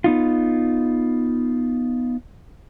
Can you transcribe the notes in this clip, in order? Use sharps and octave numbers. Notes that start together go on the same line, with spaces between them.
B3 D#4 F4